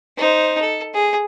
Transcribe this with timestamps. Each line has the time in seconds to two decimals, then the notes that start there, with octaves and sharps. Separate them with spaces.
0.17 D#4 C5
0.61 A4
0.94 G#4